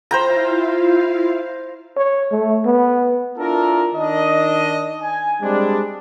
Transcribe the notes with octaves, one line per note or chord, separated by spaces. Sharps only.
E4 F4 C5 F5 G5 A#5
C#5
A3
B3
D4 E4 F4 A4 A#4
D#3 D4 D#5
G#5
G3 G#3 C4 D4